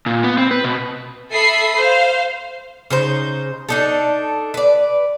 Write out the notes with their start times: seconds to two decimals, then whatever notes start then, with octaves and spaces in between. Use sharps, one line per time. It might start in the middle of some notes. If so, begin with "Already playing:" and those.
0.06 A#2
0.24 B3
0.38 C4
0.51 B4
0.64 B2
1.31 A4 E5 B5 D#6 C7
1.76 C5 F5
2.90 C#3 D#4 C5
3.69 D4 D#4 A4
4.54 B4 D5